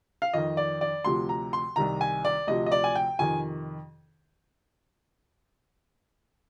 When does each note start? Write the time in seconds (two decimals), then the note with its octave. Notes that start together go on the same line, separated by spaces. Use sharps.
0.22 F5
0.34 F2 D#3 D#5
0.57 D5
0.81 D5
1.05 D2 C3 F3 C6
1.29 A#5
1.53 C6
1.76 C2 C3 D#3 A#5
2.01 G#5
2.25 D5
2.47 D2 C3 F3 D#5
2.66 D#5
2.72 D5
2.84 G#5
2.95 G5
3.19 F2 C3 D#3 G#5